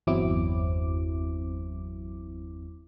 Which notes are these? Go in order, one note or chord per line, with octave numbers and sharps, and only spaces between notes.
G1 E2 F#3 C4 E4 D6